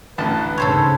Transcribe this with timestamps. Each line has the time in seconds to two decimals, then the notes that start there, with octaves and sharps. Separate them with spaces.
0.18 A1 D2 B4 A5
0.58 G#2 C#3 A4 C5 C#5